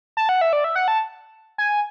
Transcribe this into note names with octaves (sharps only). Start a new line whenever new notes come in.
A5
F#5
E5
D5
E5
F#5
A5
G#5